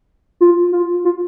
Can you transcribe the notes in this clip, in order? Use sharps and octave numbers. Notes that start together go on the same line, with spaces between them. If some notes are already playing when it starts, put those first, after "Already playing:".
F4
F4
F4